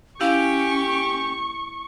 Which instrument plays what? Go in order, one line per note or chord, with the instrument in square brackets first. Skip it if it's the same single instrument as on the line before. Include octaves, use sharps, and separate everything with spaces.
[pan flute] C#4 [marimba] E4 F5 [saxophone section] G4 [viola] C#6